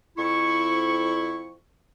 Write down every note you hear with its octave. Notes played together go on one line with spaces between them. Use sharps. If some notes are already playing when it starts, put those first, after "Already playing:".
F2 E4 C#6